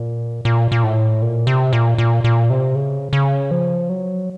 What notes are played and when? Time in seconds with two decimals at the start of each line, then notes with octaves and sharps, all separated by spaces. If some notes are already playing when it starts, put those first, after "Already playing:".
Already playing: A#2
0.45 A#2
0.72 A#2
0.83 A2
1.22 A#2
1.47 C3
1.73 A#2
1.98 A#2
2.24 A#2
2.50 C3
2.75 C#3
3.13 C#3
3.51 F3
3.89 F#3